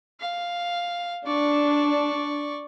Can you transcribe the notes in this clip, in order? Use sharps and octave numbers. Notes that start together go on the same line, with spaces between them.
F5
D4 D5 C#6